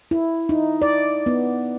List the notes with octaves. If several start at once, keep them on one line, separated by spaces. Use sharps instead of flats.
E4
D#4
D5
B3